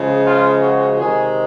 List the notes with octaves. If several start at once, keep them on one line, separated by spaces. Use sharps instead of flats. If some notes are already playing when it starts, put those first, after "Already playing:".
Already playing: C#3 F3 G#3
F4
F#4
C3 D#3 G#3 G#4